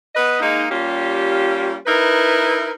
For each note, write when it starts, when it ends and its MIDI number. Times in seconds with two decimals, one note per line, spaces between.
0.15 0.39 59
0.15 0.39 71
0.15 0.39 75
0.40 0.65 56
0.40 0.65 58
0.40 0.65 63
0.71 1.76 55
0.71 1.76 58
0.71 1.76 61
0.71 1.76 65
0.71 1.76 67
1.85 2.70 63
1.85 2.70 64
1.85 2.70 70
1.85 2.70 71